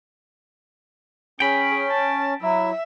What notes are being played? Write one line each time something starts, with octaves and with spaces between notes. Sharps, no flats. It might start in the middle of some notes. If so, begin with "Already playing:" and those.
C#4 G#4 G5 B5
A5
F#3 E4 E5